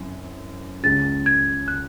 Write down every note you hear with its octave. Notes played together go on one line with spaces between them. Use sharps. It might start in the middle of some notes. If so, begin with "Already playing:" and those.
Already playing: F#2 E3 C4
C#2 C#3 G#3 A6
G#6
F#6